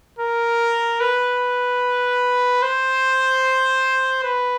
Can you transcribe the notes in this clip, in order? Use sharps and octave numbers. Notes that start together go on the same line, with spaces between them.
A#4
B4
C5
B4